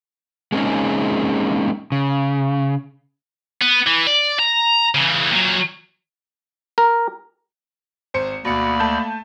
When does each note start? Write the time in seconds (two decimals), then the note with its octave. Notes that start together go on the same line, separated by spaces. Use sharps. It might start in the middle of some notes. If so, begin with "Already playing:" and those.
0.52 G#3 A#3 C4 C#4 D#4 G#4
1.92 C#3
3.62 B3
3.87 E3
4.07 D5
4.39 A#5
4.95 C#3 E3
5.33 A#2 F#3
6.78 A#4
8.14 G#1 C5 C#7
8.45 D2 B2 A#3 D5 B5 C#7
8.80 A3 A5 G6